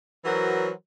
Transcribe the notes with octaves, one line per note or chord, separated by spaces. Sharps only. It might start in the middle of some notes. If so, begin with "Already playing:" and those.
E3 F#3 F#4 A#4 C5 C#5